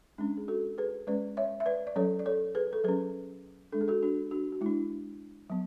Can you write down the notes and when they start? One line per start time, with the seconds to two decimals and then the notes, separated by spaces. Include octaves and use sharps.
0.18 G#3 C#4 D4
0.37 G#4
0.48 F#4 A4
0.78 G#4 B4
1.07 G#3 C#4 B4 D5
1.37 C#5 E5
1.60 E5
1.66 B4 D5
1.87 D5
1.96 F#3 C#4 A4 C#5
2.19 D5
2.26 A4 C#5
2.55 G#4 B4
2.73 A4
2.84 F#3 C#4 G#4 B4
3.72 G#3 D4 A4
3.81 G#4
3.88 F#4 A4
4.02 D4 F#4
4.31 D4 F#4
4.52 F#4
4.61 G#3 D4 E4
5.50 F#3 B3